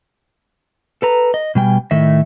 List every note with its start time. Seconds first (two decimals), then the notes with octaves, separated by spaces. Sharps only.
1.02 A4 B4 A#5
1.34 D#5
1.55 B2 G3 G5 G#5
1.91 A2 D#3 A3 D#5 E5